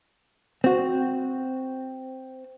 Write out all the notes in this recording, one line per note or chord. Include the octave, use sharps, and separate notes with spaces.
C4 F#4